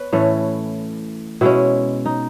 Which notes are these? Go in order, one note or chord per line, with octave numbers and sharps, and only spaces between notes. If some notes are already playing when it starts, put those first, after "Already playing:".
Already playing: B3 B4 C#5
A2 E3 A3 C#4
B2 G#3 C#4 E4
D#4